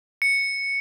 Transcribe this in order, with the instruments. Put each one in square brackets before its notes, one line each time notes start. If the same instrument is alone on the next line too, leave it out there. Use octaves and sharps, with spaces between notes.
[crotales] C#7